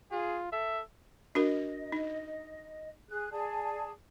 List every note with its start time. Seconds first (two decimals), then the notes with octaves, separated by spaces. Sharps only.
0.12 F4 G#4
0.52 A4 E5
1.35 D4 F#4 A#4 D#5
1.92 D#4
3.09 G#4 F#6
3.31 G#4 D5 A5